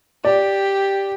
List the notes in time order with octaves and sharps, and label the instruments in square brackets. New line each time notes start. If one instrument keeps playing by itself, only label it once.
[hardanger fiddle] G4 [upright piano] D5